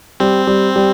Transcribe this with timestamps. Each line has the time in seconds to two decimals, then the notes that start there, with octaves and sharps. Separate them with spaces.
0.20 G3 C4
0.47 G3
0.76 G3